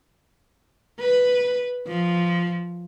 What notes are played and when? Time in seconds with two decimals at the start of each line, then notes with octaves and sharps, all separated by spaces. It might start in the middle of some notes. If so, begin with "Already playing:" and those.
1.00 B4
1.87 F3